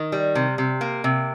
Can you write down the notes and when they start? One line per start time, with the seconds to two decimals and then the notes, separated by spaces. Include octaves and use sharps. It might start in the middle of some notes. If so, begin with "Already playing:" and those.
Already playing: D#3
0.12 G3
0.35 C3
0.58 C3
0.81 A#3
1.04 C3